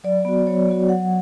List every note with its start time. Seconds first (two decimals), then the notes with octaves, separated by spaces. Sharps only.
0.04 F#3 D5
0.25 B3 F#4
0.47 F#3 C#5
0.67 B3 F#4
0.89 F#3 F#5